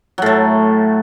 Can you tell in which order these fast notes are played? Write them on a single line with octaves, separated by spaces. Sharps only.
F#3 A2 A3